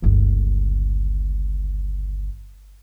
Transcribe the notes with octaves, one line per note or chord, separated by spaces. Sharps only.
G1 C#2